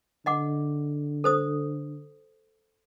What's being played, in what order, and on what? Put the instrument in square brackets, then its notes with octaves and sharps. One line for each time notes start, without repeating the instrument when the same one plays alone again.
[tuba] D3 [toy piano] D#5 F#5 D6
[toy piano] A4 C5 D#6